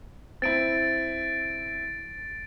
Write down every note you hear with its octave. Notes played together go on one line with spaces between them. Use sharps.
C4 E4 A6 D7